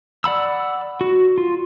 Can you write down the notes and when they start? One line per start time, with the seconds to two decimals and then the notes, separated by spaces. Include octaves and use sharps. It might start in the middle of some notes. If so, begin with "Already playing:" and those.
0.24 D5 F#5 B5 E6
1.01 F#4
1.38 F4